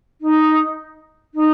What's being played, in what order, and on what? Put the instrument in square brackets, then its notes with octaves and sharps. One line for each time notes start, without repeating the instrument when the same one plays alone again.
[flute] D#4
D#4